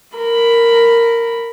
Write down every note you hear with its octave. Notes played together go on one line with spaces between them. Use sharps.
A#4 B5